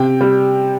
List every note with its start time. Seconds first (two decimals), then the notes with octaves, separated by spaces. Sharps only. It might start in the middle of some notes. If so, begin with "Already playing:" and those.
Already playing: C3 G5
0.21 G3